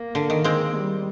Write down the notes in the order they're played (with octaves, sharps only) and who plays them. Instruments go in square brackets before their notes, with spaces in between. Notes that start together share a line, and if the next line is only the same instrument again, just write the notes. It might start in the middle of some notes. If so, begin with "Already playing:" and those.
Already playing: [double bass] A#3
[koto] D3
D#3
G#3 C4
[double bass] G3